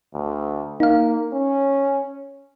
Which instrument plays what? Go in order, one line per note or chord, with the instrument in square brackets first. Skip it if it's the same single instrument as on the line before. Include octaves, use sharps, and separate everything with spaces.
[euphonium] D2
[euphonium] A#3 [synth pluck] D#4 F5
[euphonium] C#4